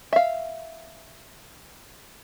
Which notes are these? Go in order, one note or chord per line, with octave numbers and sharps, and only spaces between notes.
E5 F5